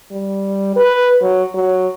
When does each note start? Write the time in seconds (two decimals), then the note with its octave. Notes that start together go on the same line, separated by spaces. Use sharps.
0.11 G3
0.76 B4
1.22 F#3
1.54 F#3